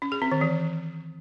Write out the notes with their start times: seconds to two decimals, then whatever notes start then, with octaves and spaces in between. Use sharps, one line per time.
0.02 C#4
0.12 G#4
0.22 C4
0.32 D#3
0.41 E3